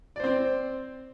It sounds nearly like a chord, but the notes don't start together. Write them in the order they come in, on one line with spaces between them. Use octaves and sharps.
D5 C5 C4